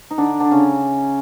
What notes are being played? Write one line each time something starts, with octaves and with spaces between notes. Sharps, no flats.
D#4
D3 D4
D3 D4
C#3 C#4